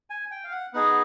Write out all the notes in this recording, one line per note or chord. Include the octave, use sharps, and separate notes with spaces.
G#5
G5
F5
F#5
B3 D#4 G#4 F#5